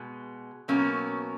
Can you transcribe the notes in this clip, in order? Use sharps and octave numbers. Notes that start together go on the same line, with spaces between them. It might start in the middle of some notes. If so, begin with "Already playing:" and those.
Already playing: B2 G#3
B2 F#3 A#3 C#4